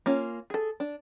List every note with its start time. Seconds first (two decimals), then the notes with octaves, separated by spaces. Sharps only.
0.06 A#3 C#4 F4
0.50 G#4 A4
0.80 D4